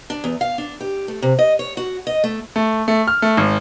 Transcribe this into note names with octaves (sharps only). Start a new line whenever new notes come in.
D4
E2
F5
D4
G4
A3
C3
D#5
C#5
F#4
D#5
A3
A3
A3
F6
A3
G#1